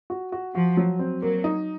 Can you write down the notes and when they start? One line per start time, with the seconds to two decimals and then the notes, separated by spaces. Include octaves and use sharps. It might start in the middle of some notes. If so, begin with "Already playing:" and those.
0.10 F#4
0.32 F#4
0.55 F3 F#4
0.77 F#3
0.99 C4
1.21 F#3 A#3
1.44 D#4